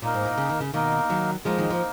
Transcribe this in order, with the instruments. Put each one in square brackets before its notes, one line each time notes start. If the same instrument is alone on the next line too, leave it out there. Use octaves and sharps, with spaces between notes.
[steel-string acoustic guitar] A#2 [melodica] A#3 D#4 A#4
[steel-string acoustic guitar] G#2
A#2
C#3
D#3
C#3
[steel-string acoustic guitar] B2 D#3 [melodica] A#3 D#4 A#4
[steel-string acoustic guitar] D#3 F#3
[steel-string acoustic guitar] F3 G#3 [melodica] A#3 D#4 A#4
[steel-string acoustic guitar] D#3
F3